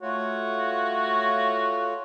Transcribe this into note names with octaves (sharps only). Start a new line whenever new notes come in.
A3 F4 F#4 C#5